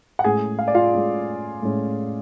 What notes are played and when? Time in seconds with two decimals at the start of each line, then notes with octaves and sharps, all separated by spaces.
0.19 F#5
0.24 A2 G#3 C#4 G#4 G#5
0.59 F5
0.68 D5
0.75 F4 F5
0.93 A2 G#3 C#4
1.62 A2 G#3 C#4